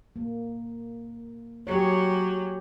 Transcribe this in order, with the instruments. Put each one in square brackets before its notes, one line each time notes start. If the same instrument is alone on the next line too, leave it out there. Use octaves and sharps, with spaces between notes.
[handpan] A#3
[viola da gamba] F#3 [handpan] G4 G#4 C#5